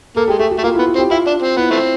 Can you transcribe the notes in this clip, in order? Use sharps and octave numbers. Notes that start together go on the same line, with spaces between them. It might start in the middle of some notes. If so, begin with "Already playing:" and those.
A#3 A4
G#3 G4
A3 G#4
F#4
A3
A#3 F4
B3 E4
F#4
C4
G4
E4 F4
D4
C4
B3 E4
E3 A3 C4